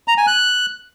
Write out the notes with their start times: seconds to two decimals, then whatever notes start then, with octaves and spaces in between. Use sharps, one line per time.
0.08 A#5
0.17 G#5
0.27 F#6